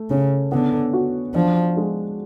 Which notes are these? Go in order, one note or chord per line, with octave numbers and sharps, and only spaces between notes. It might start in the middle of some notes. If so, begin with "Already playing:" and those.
Already playing: A3
C#3 C#4
D3 B3
F#4
F3 D4
G#3